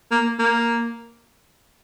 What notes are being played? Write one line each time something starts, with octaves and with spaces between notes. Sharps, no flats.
A#3
A#3